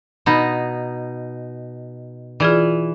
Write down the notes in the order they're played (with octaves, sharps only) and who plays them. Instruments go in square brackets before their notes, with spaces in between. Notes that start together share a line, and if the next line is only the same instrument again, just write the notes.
[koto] B2 D#4 [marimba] B5
[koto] E3 [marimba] F4 G#4 D5